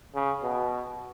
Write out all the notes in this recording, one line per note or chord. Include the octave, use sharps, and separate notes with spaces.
C#3
B2